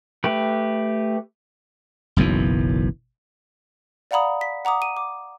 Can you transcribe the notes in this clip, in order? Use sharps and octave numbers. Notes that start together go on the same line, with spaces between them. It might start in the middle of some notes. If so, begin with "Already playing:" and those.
A3 G4 B4
F#1 B1 F#2 E3
D5 F5 F#5 A#5 B5 D#6
B6
F#5 A#5 D6 D#6
D#7
D6